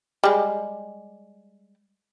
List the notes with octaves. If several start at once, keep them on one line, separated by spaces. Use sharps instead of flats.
G3 G#3